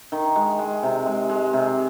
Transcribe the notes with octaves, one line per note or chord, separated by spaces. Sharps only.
D#3
G#3
G#3
C3
G#3
G#3
C3